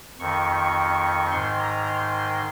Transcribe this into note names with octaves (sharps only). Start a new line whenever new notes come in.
F2 D#3 C#6
G#2 D#3 C6
A#5
C6